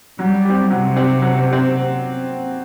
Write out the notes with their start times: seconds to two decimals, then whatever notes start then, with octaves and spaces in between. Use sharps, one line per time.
0.19 F#3 G3
0.45 C4 G4
0.70 C3 F#3
0.96 C4 G4
1.22 F#3
1.48 C4 G4